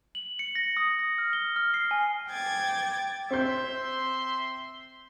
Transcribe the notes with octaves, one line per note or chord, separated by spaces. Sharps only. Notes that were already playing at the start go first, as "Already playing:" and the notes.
F#7
C#7
A#6
D#6
A#6
F6
G7
F6
C7
G#5
G5 D6 G#6 A6
C4 E5 C6 G6